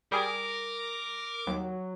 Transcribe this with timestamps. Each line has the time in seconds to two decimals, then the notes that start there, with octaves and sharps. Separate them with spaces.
0.12 G3 G#4 A#4 D6
1.47 D#2 F#3